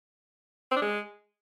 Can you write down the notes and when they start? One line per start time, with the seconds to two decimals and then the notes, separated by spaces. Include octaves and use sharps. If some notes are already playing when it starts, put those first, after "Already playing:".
0.71 C4
0.77 D4
0.82 G#3